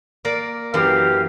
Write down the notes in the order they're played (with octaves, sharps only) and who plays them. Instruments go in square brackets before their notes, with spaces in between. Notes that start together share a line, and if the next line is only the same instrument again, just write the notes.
[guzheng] A#3 A#4 D5
[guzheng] F#2 E3 [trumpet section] G4 F5